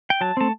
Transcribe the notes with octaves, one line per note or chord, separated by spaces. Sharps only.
G5
F#3 A5
A3 C4 A5